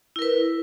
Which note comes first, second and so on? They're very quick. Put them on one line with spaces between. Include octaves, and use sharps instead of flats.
E4 A#4 B4